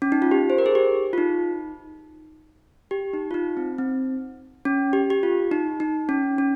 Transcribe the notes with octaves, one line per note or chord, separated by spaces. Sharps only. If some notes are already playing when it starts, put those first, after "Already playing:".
C#4
D#4
F4
G4
C5
A#4
G#4
G4
F4
D#4
G4
D#4
F4
D#4
C4
C4
C#4
G4
G4
F4
D#4
D#4
C#4
C#4